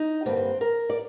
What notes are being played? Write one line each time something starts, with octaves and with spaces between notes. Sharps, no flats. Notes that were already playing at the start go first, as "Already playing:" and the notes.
Already playing: D#4
G2 D3 G3 A#3 C4
A#4
D5